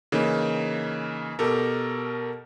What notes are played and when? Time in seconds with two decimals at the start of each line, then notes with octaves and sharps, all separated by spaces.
0.12 C#3 E3 A#3 D#4
1.39 B2 G4 A4 A#4